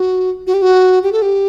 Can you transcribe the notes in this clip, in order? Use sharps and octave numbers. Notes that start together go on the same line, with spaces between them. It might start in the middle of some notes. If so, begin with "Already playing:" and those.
Already playing: F#4
F#4
G4
F#4
G4
A4
G4